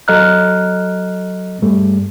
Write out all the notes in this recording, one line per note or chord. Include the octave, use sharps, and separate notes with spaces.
F#3 A4 D#5 A#5 F6 F#6
G2 G3 A3